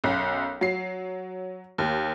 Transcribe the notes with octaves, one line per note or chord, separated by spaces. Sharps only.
B1 F#2
F#3 C7
D#2